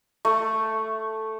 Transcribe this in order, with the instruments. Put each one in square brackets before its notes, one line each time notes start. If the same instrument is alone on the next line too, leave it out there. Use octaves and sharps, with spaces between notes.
[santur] A3